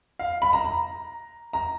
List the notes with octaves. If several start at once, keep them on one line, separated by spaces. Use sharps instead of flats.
F5
B5
A#5
A#5
A#5